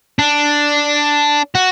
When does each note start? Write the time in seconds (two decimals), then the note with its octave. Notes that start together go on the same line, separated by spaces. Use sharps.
0.19 D4
1.55 F#4